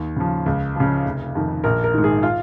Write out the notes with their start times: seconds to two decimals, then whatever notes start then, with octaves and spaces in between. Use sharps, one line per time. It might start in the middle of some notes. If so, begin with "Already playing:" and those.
Already playing: D#2
0.16 C#3 F3
0.46 C#2
0.75 C#3 F3
1.05 F1
1.35 F2 D#3
1.64 A#1 A#4
1.84 A#4
1.94 G#2 D#3
2.04 G#4
2.23 F4